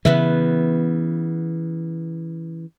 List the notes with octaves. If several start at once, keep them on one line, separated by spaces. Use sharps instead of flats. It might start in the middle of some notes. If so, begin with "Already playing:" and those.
C#3 E3 B3 B4 E5